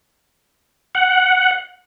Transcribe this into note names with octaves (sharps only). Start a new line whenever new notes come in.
F#5